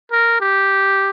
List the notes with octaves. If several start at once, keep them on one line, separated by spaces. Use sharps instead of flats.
A#4
G4